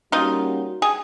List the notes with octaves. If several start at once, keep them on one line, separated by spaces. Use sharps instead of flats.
G3 A#3 C#4 D#4 F4 F#4
G#4